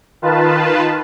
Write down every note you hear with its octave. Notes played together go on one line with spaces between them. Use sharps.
D#3 F4 B4 A5